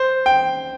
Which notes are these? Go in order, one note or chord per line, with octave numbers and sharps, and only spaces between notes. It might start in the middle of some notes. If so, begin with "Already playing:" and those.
Already playing: C5
G5